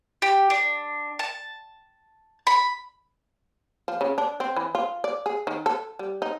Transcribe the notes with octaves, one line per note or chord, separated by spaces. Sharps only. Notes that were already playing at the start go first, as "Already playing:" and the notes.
G4
D4
A5
B5
F3
C#3
D4
C4
E3
F4
D5
G#4
D#3
A4
G3
D#4